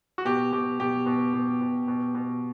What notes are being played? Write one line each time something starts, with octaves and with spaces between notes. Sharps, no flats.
F#4
B2 G4
B2 G4
B2 G4
B2
B2
B2
B2
B2